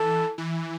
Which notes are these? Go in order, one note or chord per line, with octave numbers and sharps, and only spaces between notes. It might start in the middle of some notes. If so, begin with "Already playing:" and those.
Already playing: E3 A4
E3